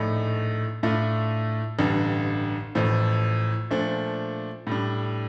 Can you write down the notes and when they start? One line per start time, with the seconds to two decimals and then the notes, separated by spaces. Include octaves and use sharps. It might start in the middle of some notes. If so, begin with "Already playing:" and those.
Already playing: A#1 A2 A3 D#4
0.83 A2 A3 D4 F4
1.79 A1 G2 D3
2.75 A1 A2 F3
3.71 A#2 F3 A3 D4
4.67 A2 G3 D4